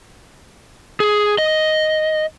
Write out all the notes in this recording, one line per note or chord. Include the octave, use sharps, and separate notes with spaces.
G#4
D#5